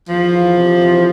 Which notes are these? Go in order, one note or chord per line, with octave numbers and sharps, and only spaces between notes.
E2 F3
E2
C3
E2